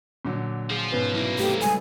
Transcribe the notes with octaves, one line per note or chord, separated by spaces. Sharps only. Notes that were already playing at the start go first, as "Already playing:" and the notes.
A#2 D3 F#3
F3 F4 G#4
G#2 B2 C#4 B4
C2 F#3 A#3 E4
A3 C4 G4 A4
C#3 G3 G#3 G#5